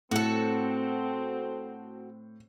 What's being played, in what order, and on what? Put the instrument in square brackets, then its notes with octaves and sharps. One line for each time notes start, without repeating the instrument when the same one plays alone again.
[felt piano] A2 [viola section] C4 [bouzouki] F#4 A4